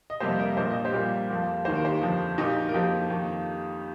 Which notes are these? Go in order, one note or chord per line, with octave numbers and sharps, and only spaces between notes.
D#5
F2 C3 G3 A#3 G4 C5
A#4 D#5
A#1 A#2 A#3 C5
D#5
G4 C5
A#1 A#2 G3 A#3
F2 F3 A#3
D#2 D#3 A#3 C5
A#4
G4 C5
G1 F2 F3
A#1 A#2 A#3 D#4 G4
A#4
F2 F3 A#3 D#4 G4
F2 D#3 A#3